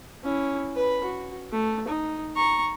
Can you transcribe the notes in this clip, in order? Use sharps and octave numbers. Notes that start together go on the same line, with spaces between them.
C#4 E4
B4 B5
F#4
A3
D#4
A#5 C#6